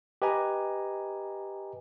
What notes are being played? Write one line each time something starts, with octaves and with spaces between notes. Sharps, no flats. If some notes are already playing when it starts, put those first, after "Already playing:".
G4 B4 D#5 G#5 A#5